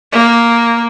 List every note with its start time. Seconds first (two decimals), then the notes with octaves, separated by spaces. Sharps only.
0.12 A#3